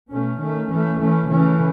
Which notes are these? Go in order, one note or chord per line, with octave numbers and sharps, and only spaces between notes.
B2 A3 C#4
D#3 A3 C#4
E3 A3 C#4
E3 A3 C#4
C#3 E3 A3 C#4